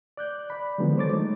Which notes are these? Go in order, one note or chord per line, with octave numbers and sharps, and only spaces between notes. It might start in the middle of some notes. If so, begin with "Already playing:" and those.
D5 F#6 G6
D5 B5
D3 D#3 F3 F#3 G#3 B3
A4 C5 C#5 D6 A6
G#3 A3 D#4